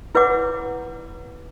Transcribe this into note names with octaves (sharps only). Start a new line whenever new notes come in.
E4 B4 C#5 F#5 D6